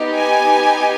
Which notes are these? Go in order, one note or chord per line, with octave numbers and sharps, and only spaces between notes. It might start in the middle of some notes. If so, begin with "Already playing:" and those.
Already playing: B3 D#4 G4
G#5